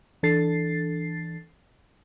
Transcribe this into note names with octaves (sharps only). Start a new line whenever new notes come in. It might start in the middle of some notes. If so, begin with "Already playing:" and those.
E3 D4 A4 A6 C7